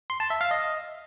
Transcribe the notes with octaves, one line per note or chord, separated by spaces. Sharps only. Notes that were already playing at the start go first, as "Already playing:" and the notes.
C6
A5
E5
F5
D#5